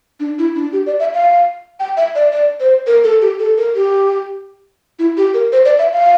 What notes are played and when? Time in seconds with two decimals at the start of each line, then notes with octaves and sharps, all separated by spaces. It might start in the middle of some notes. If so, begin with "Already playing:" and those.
0.20 D4
0.39 E4
0.55 D4
0.73 G4
0.86 D5
1.00 E5
1.14 F5
1.80 G5
1.97 E5
2.15 D5
2.33 D5
2.60 C5
2.87 A#4
3.04 A4
3.21 G4
3.39 A4
3.58 A#4
3.75 G4
4.99 E4
5.17 G4
5.34 A#4
5.52 C5
5.65 D5
5.79 E5
5.93 F5